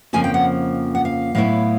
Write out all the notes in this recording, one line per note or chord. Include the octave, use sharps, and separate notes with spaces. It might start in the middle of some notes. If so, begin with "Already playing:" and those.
F2 C#3 F3 A#3 G#5
G5
F#5
F#5
F5
A2 F#3 B3 E4 F5